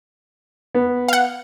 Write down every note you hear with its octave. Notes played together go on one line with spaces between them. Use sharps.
B3
F5 F#5